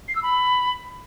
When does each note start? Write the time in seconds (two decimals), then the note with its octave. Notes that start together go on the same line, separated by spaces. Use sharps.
0.08 C7
0.16 E6
0.23 B5